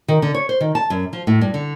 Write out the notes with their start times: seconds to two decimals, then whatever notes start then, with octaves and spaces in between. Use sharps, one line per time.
0.08 D#3
0.22 D3
0.34 C#5
0.49 C5
0.61 D#3
0.75 A5
0.90 F#2
1.13 F3
1.27 A2
1.41 G2
1.54 D3